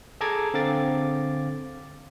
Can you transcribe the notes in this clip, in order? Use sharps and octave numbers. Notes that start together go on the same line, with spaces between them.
G#4 A4 A5 A#5 D6 G#6
D3 C4 F5 D6 A6